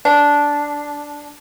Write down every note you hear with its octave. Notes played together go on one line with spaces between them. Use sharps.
D4